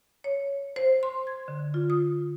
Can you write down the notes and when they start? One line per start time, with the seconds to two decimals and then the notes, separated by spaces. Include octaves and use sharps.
0.24 C#5
0.76 C5
1.03 C6
1.27 G#6
1.48 D3
1.74 F4
1.90 D#6